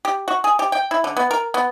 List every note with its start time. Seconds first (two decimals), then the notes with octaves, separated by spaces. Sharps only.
0.05 G4
0.28 F#4
0.44 G#4
0.59 G4
0.72 G5
0.91 E4
1.04 D3
1.17 B3
1.31 A#4
1.54 B3